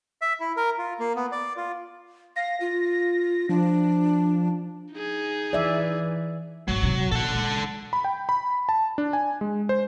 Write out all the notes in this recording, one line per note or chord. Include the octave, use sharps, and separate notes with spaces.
E5
E4
A#4
F4
A#3
B3
D5
F4
F5 A#6
F4
F3 D4
D#4 G#4
E3 D5 E5
G#1 F#3
C3
A#2 A4 F#5
G#3
B5
G5
B5
A5
D4
G#5
G#3
C5